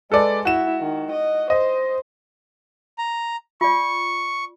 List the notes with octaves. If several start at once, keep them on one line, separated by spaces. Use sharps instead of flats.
G#3 A4 B4 D5
E4 F#4 E7
D#3
D#5
C5 D#5
A#5
F4 D5 C#6